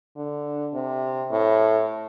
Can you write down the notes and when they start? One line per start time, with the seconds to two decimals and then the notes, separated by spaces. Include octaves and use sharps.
0.16 D3
0.74 C3
1.31 A2